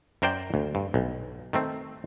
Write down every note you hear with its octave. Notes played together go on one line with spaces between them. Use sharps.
F#2 A#4 C5 D5 G5
D2
G2
B1
D#3 A3 C4